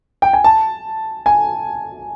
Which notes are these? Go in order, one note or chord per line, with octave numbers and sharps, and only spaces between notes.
G5
G#5
A5
G#5